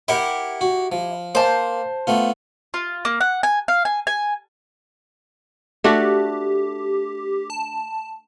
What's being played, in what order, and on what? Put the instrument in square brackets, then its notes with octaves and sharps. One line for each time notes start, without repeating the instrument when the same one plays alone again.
[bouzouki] E4 G4 [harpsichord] A#4 F#5 G5
[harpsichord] F#4
F3
[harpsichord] A#3 [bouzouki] C5 A5
[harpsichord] A3 B3 F4
[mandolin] F4
A#3
F#5
G#5
F5
G#5
G#5
[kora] A3 D4 F#4 [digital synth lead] G4
[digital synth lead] A5